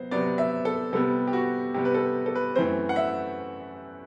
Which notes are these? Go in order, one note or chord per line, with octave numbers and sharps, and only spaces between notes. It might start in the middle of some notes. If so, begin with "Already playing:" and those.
Already playing: C3 F#3 B3 C5
C3 F#3 B3 D5
E5
A4
C3 G3 B3 A4
G4
F#4
C3 G3 B3 G4
B4
A4
A4
B4
F#2 E3 A3 C4 C5
F#5
E5